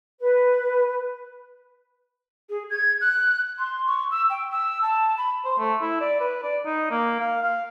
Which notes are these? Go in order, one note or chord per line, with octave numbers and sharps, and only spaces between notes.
B4
G#4
G#6
F#6
C6
C#6
E6
G5
E6
A5
B5
C5
A3
E4
D5
B4
D5
D#4
A#3
F5
F5